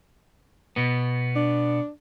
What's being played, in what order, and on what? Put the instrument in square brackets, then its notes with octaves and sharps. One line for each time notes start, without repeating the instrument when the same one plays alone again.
[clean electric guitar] B2 B3
[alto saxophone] D4